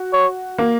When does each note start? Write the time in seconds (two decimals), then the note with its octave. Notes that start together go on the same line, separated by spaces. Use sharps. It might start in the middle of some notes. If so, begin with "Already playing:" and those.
Already playing: F#4
0.13 C#5
0.58 A#3